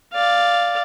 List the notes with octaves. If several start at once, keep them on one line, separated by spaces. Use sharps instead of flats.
D5 F5